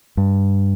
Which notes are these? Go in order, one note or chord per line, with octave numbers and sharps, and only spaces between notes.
G2